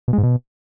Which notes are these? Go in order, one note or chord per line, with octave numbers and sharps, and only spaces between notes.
B2
G#3
G#2
B2